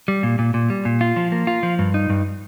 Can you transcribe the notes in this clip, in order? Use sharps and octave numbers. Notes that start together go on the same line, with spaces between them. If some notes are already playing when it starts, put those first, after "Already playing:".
G3
A#2
A#2
A#2
G3
A#2
F4
F3
A#3
F4
F3
G2
D#4
G2